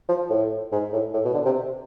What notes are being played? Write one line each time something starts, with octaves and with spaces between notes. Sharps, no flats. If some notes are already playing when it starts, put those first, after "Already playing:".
F3
A2
G#2
A2
A2
B2
D3
C3